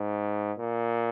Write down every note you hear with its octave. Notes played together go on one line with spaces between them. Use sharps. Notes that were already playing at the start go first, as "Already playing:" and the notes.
Already playing: G#2
A#2